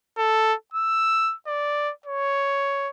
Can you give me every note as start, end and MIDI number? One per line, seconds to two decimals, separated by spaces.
0.18 0.54 69
0.74 1.35 88
1.47 1.92 74
2.06 2.90 73